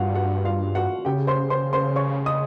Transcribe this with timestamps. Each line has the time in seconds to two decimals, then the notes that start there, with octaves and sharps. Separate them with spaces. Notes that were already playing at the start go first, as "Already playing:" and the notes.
Already playing: G2 F4 F#4 F5 F#5
0.15 F#4 F#5
0.45 F4 F5
0.75 F#4 F#5
1.05 C#3 G4 G5
1.27 C5 C6
1.50 C5 C6
1.73 C5 C6
1.96 C#5 C#6
2.26 D#5 D#6